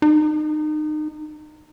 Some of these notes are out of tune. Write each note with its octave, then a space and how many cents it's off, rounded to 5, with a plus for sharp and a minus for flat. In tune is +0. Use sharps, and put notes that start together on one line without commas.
D#4 -30